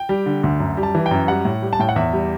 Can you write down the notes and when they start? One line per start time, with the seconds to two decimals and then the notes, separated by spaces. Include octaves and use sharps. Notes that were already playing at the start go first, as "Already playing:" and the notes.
Already playing: G5
0.09 G3
0.26 D3
0.43 D2
0.60 F#2
0.77 G3
0.83 A5
0.95 E3
1.06 G5
1.11 F#2
1.28 G3 F#5
1.45 A2
1.62 G3
1.73 A5
1.79 A2 G5
1.89 F#5
1.96 E2 E5
2.13 G3